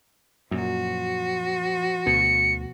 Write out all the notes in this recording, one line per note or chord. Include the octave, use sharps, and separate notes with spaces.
F#2 A#2 F3 F#4
D2 B2 C#7